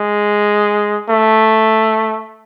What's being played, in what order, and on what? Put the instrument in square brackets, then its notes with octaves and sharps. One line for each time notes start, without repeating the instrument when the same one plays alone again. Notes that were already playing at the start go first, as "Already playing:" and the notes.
Already playing: [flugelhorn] G#3
A3